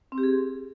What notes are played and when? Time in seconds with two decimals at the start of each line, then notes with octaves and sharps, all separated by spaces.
0.12 C4
0.18 G4
0.23 G#4